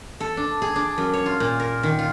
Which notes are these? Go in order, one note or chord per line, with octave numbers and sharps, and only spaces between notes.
A4
D4
G#4
D4
F#2
C#5
F4
A#2
A#4
D#3
F4